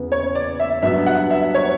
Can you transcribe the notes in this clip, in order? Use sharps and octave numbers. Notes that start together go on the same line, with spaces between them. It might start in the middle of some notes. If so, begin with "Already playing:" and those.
Already playing: E2 C#3 E3 B3
C#5
D5
E5
G2 F#3 B3 D4 E5
F#5
E5
C#5